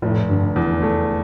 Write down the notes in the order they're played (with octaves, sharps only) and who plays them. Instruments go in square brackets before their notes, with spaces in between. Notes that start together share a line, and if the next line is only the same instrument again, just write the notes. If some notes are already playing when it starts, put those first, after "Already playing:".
[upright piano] F1 [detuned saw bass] A2
[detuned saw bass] G2 [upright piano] D3
[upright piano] E2
A3